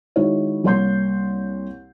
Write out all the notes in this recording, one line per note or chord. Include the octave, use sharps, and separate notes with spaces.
D#3 G#3 D#4 E4 F#4 C#5
C2 A#3 C#5 C6 G6 C7